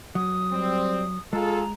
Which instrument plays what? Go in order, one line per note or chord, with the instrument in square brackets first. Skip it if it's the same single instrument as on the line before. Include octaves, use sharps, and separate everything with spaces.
[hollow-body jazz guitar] F#3 [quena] D#6
[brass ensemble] G3 C4
[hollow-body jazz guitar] G#3 [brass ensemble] F4 G#4 A4 [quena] A#5